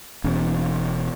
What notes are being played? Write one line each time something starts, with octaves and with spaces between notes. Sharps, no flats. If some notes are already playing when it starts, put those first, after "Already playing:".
E1 E2 C#4